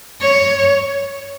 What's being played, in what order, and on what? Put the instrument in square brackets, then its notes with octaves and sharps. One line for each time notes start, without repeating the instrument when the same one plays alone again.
[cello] C#5